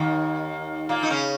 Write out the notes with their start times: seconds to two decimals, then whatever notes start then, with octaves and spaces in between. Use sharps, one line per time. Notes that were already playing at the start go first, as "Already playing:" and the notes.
Already playing: D#2 D#3
0.89 A#2 A#3
1.03 D#4
1.10 C#3 C#4